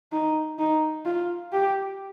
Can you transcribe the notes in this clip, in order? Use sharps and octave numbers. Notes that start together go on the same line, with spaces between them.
D#4
D#4
F4
G4